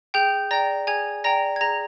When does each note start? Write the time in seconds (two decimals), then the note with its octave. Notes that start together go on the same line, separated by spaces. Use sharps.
0.14 G#4 G5 G6
0.51 D5 G5 A#5 A#6
0.87 G#4 G#5 G#6
1.24 D5 G5 A#5 A#6
1.56 G#6
1.61 G#4 A#5 A#6